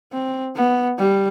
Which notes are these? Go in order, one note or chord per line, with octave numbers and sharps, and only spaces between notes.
C4
B3
G3